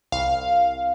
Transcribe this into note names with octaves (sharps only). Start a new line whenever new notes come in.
C2 F5